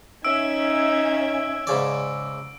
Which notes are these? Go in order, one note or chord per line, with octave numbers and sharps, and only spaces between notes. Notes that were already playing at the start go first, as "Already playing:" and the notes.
C#4 D#4 E5 E6 G#6 D7
G#2 C#3 D5